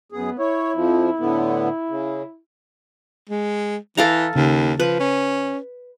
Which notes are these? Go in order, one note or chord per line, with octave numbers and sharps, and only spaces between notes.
F#2 B3 G#4
E4 C#5
F2 F3
A2 D3 B3
C#3
G#3
E3 A4 F5 A#5
D#2 C#3
F3 B4
C#4